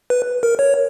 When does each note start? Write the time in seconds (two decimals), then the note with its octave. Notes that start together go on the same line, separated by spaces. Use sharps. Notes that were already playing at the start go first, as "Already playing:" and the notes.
0.10 B4
0.43 A#4
0.59 C#5